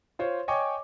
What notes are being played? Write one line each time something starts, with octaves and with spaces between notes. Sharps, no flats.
F4 C5 C#5
C#5 D#5 G5 G#5 C#6 D6